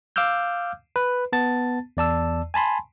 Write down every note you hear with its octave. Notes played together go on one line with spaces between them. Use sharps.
F5 D6 E6 F6 G6
B4
B3 A5 A6
E2 D5 A5 E6
G#5 A5 B5 C6